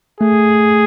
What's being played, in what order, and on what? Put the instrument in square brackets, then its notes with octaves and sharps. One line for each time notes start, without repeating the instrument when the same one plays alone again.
[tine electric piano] A3 [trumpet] G#4